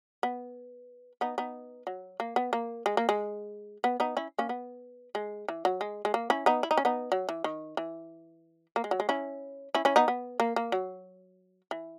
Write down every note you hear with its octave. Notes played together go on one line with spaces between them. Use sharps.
B3
B3 D#4
B3 D#4
F#3
A#3
B3
A#3
G#3
A#3
G#3
B3
B3 D#4
C#4 E4
A#3 C#4
B3
G#3
E3
F#3
G#3
G#3
A#3
C#4 E4
B3 D#4
E4
D#4
C#4
B3 D#4
F#3
E3
D#3
E3
A#3
G#3
F#3
G#3
C#4 E4
C#4 E4
C#4 E4
B3 D#4
B3
A#3
A#3
F#3
E3